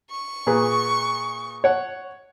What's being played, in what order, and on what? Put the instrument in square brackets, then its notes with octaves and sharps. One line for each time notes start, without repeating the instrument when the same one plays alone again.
[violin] C#6
[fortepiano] A#2 G#4 B4
C#5 F#5